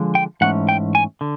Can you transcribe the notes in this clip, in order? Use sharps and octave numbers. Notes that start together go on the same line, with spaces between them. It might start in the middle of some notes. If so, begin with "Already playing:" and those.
Already playing: D3 F3 G#3
G5
G#2 E3 A3 C#4 F#5
G5
G#5
D3